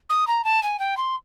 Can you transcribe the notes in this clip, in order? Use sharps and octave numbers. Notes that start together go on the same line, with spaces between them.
D#6
A#5
A5
G#5
G5
C6